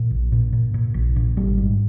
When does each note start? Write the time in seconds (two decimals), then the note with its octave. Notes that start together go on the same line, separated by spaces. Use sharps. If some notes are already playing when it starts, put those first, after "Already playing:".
Already playing: A#2
0.11 A#1
0.32 A#2
0.53 A#2
0.74 A#2
0.94 A#1
1.16 A#2
1.37 G#1 G3
1.58 G#2